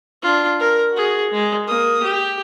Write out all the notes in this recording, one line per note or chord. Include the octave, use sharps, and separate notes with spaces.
D4 F4
A#4
F#4 G#4
G#3
A#3 D#6
G4